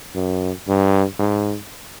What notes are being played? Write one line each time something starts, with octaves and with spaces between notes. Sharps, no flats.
F#2
G2
G#2